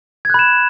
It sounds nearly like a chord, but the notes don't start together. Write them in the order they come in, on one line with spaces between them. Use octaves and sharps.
G#6 F#6 B5 E7